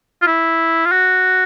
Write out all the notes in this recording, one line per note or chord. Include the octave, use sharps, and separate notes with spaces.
F4
E4
F4
F#4